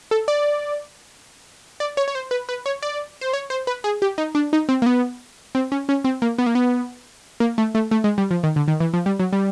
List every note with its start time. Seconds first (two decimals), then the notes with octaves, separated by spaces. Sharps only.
0.11 A4
0.28 D5
1.80 D5
1.97 C#5
2.08 C#5
2.15 C5
2.31 B4
2.49 B4
2.66 C#5
2.82 D5
3.21 C5
3.33 C#5
3.50 C5
3.67 B4
3.84 G#4
4.02 G4
4.18 D#4
4.35 D4
4.53 D#4
4.69 C4
4.82 A#3
4.86 B3
5.55 C4
5.72 C#4
5.89 C#4
6.04 C4
6.22 A#3
6.38 B3
6.46 A#3
6.55 B3
7.40 A#3
7.58 A3
7.75 A3
7.91 A3
8.04 G#3
8.18 G3
8.31 F3
8.43 D#3
8.56 D3
8.68 D#3
8.80 E3
8.94 F3
9.06 G3
9.19 F#3
9.33 G3